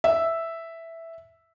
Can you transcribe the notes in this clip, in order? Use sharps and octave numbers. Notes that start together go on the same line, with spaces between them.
E5